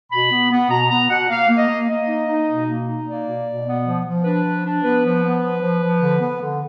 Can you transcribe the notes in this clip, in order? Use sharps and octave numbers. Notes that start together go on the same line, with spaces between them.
B2 B5
B3
B3
B2 A#5
B3 A#5
B2 F#5
A#3 F5
A#3
D#5
A#3
A#3 D#5
D#4
D#4
B2
A#3
D#4
A#3 D5
B2
B2
B3
F3
F3
D4 B4
F3
D4
B3 B4
F3
B3
F3
F3
F3
D3
B3
D3